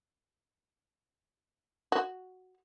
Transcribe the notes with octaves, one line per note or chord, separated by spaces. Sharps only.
F#4